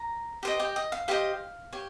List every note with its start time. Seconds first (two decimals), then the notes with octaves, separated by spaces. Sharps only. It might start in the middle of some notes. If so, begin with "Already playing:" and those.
Already playing: A#5
0.43 G4 C5 D#5
0.59 G4 G5
0.76 D#5
0.92 F5
1.08 G4 C5 D#5 F5
1.73 G4 C#5